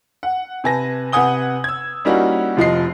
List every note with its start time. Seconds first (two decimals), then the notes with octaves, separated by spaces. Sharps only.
0.23 F#5
0.64 C3 B4 G#5 A5 A#6
1.12 C3 B4 F#5 G#5 D#6 G7
1.64 E6 G#6
2.05 G3 A#3 C#4 D#4 E4 F#4
2.57 F1 F3 D#5 C7